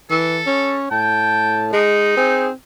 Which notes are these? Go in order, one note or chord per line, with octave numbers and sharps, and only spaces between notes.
E3 A4
C#4 C#5
A2 G5 A5
G#3 D#4
C4 G#4